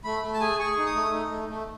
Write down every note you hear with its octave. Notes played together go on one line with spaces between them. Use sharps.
A3 B5
A3
A5
G#4 G#5
G#4 C#6
D#4
D#6
A3
D#4
A3
A3